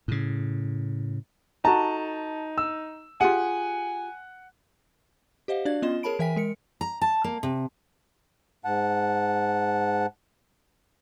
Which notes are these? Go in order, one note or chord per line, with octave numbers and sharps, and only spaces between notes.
A2 C#3
D#4 F#4 A4 A5 A#5
E6
F4 G4 G#4 F#5 G#5
G4 C5 D#5 F5 F#5
D4 F#4 D5 F5 G#6
B3 C#4 F4 D#5 C6 E7
G#4 A#4 C#5 A5 B5 D7
E3 A#4 E5 G5 G#5 B6
G#3 A#4 C#7
A#5
A5
A#3
C3
G#2 F#5 A5